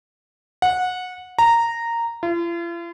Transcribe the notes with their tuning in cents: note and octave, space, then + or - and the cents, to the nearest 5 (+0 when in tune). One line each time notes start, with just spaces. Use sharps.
F#5 -20
A#5 -10
F4 -45